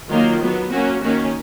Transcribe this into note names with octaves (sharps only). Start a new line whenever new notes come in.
D#3 F#3 A#3 F4
F#3 B3
F#3 A#3 C#4 F#4
D#3 A#3 C#4 F#4